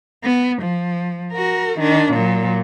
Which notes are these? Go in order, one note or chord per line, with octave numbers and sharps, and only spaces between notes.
B3
F3
F#4 A#4
D#3 D4
A#2 F#3